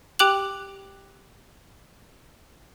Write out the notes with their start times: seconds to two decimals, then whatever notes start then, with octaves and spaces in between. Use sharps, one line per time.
0.19 G4 G5 D6 F#6 F7 F#7